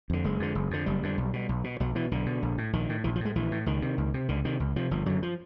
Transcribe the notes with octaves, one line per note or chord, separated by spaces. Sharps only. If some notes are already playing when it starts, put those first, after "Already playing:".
F2 D3
F#1 G#3
F2 D3
F#1
F2 D3
F#1 G3
F2 D3
B1
B2
B1
B2
B1 F#3
B2 E3
B1 D3
B2
A#1
A2
A#1 D#3
A2
A#1 E3
F3
A2 G#3
A#1 E3
A2
C#2 D#3
C3
C#2
C3
C#2 D3
C3 D#3
C#2
C3 F3
G1 F3
F#2 D3 F#3
F3